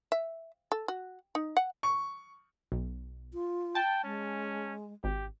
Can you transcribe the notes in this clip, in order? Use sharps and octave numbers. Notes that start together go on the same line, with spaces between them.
E5
A4
F#4
D#4
F#5
C#6
B1
F4
G5 A5
G#3 C#4
G#1 G4